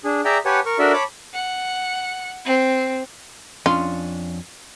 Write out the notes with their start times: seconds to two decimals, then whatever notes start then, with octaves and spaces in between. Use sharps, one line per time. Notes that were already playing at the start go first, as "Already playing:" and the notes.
0.04 D4 G#4
0.25 G#4 D5 E5 G5 A#5
0.45 G4 B4 C#5 F#5 G#5 A5
0.66 A#4 C#6
0.79 D4 F#4 A4 A#4 D5 E5
0.93 C#5 A5 B5 D6
1.33 F#5
2.45 C4
3.66 F2 C#4 D4 F4